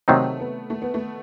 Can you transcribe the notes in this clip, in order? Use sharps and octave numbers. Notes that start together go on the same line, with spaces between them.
C3 D#3 F#3 A3 C4 D#4
B3
A3
B3
A3